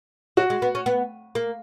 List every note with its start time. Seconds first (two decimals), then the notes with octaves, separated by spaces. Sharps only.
0.37 F#3 F#4
0.50 G#3
0.62 B3
0.75 C#4
0.86 B3
1.35 A#3